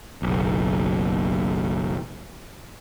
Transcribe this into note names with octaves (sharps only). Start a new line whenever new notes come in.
F#1 B1